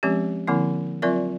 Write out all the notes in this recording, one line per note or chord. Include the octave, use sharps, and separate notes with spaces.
F3 G#3 C4 C#4 G4
D3 F3 A#3 C4 E4
F#3 C4 F4 A#4 D5 E5